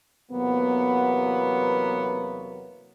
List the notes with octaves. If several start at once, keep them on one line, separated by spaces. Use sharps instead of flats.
E2 C3 F#3 A#3 B3